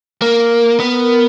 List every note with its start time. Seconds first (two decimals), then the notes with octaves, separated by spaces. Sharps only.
0.22 A#3 A#4
0.80 B3